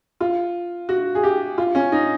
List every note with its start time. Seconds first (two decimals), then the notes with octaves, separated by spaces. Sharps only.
0.21 F4
0.89 F#4
1.15 G#4
1.23 G4
1.58 F4
1.75 C#4
1.92 D#4